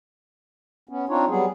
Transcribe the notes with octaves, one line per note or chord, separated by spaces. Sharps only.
B3 C#4
C4 D4 D#4 F4 C#5
F#3 G3 B3 G#4